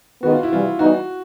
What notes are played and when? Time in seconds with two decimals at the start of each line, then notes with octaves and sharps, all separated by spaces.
0.23 D#3 G#3 B3 F#4
0.32 F4
0.43 E4
0.51 C3 E3 G3 F4
0.79 E3 G3 B3 D#4 F#4